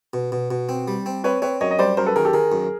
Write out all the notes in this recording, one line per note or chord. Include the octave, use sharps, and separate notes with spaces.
B2
B2
B2
C4
G3
C4
C4 B4 C#5
C4 B4 C#5
F#2 C#5 D#5
D#5
G3 C5 D5
F#2 A#4 C5
A4 B4
D#3 G#4 A#4
G4 A4
D#3 G#4 A#4
F#2